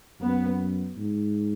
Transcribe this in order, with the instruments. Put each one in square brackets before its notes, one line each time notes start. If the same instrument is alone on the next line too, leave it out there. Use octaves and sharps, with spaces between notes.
[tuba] F#2 [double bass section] B3
[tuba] G#2